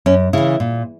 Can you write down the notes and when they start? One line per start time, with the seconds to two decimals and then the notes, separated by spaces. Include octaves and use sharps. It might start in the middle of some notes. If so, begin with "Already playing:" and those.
0.06 F#2 C#4
0.33 C#3 E3 E4
0.60 A#2